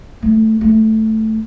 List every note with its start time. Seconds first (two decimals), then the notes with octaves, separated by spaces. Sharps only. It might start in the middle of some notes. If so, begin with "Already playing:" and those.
0.22 A3
0.61 A3